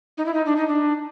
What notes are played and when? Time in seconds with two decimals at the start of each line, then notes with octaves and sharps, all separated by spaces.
0.18 D#4
0.26 E4
0.34 D#4
0.46 D4
0.56 D#4
0.68 D4